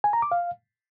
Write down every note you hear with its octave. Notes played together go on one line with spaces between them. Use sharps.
G#5
A#5
D6
F5